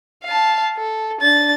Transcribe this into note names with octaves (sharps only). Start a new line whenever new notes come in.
F5 A5
A4
D4 A6